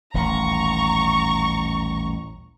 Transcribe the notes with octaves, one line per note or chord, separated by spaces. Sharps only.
D#1 A1 D#2 A#5 C#6